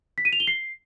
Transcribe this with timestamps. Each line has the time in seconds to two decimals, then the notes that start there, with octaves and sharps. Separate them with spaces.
0.18 B6
0.25 D#7
0.33 F7
0.40 G7
0.47 C7